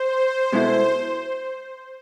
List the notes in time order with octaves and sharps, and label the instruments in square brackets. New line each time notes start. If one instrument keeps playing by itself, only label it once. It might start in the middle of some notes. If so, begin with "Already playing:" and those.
Already playing: [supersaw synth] C5
[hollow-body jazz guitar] B2 G#3 B3 E4 A4